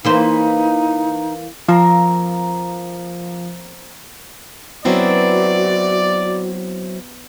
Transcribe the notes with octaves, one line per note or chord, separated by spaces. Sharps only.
E3 A#3 D#4 C5
F3 A#3 C4 A#4
F#3 B3 C4 E4 F#4 D5